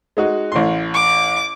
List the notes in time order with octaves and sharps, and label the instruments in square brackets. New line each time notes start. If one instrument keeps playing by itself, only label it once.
[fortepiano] G#3 D#4 F#4
A1 A2 C6
[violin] D6